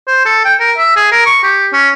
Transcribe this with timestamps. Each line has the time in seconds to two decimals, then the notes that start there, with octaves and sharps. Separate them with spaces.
0.07 C5
0.25 A4
0.45 G5
0.60 A#4
0.77 E5
0.96 G#4
1.12 A#4
1.26 C#6
1.44 G4
1.73 C#4